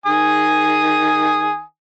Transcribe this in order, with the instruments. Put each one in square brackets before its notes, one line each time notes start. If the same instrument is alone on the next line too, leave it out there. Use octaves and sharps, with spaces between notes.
[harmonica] D#3 G#5 D#6